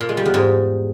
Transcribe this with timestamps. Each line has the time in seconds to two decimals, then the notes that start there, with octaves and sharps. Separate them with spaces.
0.01 A#2
0.09 G#3
0.17 G3
0.25 E2
0.34 G#2